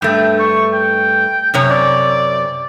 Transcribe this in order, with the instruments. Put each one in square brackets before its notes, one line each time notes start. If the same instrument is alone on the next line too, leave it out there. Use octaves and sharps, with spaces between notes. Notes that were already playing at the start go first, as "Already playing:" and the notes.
[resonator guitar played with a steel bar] G2 A3 [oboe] G5
[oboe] C#6
G5
[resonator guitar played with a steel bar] F#2 C3 C#5
[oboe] D5